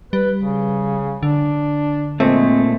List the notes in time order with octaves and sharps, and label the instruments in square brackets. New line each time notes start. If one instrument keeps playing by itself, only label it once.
[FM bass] G3 [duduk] B4
[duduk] C#3
[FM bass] D3 [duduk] D4
[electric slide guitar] A#2 A3 [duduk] G#3 [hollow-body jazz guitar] C4